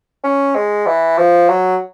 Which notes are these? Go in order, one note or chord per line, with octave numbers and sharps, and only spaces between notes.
C#4
G#3
E3
F3
F#3